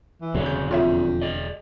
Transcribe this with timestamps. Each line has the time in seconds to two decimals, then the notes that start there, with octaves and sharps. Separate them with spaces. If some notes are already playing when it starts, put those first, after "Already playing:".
0.21 E3
0.35 E1 D3 F#3 C4 D4 G#4
0.46 C#3 G6
0.71 F2 F4 C#5 E5
1.21 G#4 D5 D#5